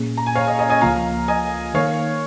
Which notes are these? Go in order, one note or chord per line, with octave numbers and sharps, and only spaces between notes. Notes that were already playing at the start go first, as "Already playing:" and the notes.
Already playing: A#2 A#3 C#4 G#4
A#5
G#5
C#5 F5
D#5 G#5
D#5 G#5
D#5 G#5
C#2 C#3 F3 A#3 F4 F5 A#5
D#5 G#5
D#3 A#3 D#4 A#4 C#5 F5